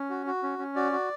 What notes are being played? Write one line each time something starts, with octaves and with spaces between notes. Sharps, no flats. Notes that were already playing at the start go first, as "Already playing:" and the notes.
Already playing: C#4
F#4
F#4
C#4
C#4
F#4 D5
F#4